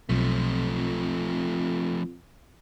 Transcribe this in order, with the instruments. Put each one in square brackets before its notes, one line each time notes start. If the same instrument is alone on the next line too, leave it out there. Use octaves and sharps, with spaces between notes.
[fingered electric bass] B1 [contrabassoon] F2 [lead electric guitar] F3 A3